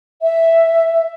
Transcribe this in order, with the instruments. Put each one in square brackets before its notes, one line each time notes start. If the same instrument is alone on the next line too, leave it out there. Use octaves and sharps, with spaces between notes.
[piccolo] E5